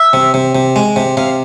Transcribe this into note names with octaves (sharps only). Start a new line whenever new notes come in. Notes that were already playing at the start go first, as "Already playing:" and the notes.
Already playing: E5
C3
C3
C3
G#3
C3
C3 F5